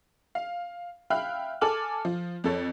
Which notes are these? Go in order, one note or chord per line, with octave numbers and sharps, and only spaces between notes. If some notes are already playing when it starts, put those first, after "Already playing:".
F5
E5 F5 G5 B5 F6 F#6
A4 G#5 A5 D6 F6 F#7
F3
F2 A4 C#5